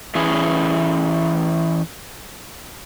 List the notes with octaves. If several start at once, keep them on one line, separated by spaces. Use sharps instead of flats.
E3 C#4 G#4 B4